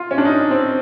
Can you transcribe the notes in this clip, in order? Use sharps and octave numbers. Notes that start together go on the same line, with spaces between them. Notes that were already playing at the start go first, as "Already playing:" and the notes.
Already playing: F4
C#4
D4
D#4
C4